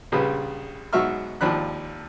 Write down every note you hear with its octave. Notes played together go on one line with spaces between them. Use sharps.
A#1 C#3 G3 B4
G#2 B2 F#3 E5 C#6 F6
G#1 D#2 F3 D4 B5 F#6